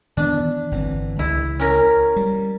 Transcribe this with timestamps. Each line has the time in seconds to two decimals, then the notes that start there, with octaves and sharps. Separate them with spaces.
0.17 D#3 E3 B3 D4
0.72 G1 E3 C4
1.19 C#2 C#3 E4
1.60 C#4 A#4
2.16 G3